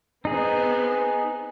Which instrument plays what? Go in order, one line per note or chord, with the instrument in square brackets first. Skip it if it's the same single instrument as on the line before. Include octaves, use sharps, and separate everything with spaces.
[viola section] B3 C4 [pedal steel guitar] D#4 G#4